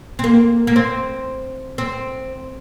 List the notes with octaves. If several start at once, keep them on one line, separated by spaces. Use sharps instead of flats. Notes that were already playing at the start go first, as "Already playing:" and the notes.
C4
A#3
A#3
C4
C4